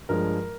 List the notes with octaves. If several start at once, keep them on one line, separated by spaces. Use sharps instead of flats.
G2 F3 G#3 A#4